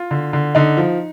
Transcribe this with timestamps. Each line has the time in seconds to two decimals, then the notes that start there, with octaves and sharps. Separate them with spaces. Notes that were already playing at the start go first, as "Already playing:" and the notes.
Already playing: F4
0.11 D3
0.33 D3
0.55 D3 D#4
0.77 F3